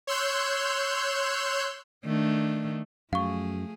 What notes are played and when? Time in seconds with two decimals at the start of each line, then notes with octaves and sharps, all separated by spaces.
0.07 C#5 C6 E6 F#6 G6
2.05 D#3 A3 D4
3.13 F#2 F3 A3 G#4 F5 C#6